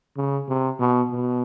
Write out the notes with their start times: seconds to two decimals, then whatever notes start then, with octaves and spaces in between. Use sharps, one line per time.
0.17 C#3
0.48 C3
0.80 B2
1.11 B2